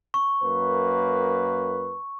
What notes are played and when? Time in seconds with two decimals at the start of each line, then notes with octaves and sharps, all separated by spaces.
0.14 C#6
0.44 F#2 A#3 B4